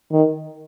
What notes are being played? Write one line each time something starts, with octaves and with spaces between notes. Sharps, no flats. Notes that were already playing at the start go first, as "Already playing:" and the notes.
D#3